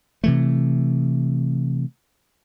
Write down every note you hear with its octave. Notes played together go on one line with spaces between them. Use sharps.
C3 E3 A3